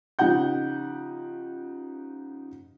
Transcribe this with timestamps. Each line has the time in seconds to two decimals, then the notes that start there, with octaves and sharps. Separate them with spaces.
0.19 C#3 F3 D#4 G4 F#5 G6